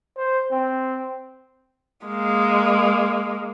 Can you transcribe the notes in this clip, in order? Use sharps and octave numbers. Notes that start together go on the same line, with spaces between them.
C5
C4
G#3 A#3